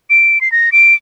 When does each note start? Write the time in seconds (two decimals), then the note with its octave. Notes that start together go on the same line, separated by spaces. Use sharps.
0.10 D7
0.41 C7
0.52 A#6
0.72 D7